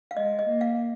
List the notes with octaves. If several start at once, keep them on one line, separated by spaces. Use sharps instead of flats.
F5
G#3 D#5
D#5
A#3
F5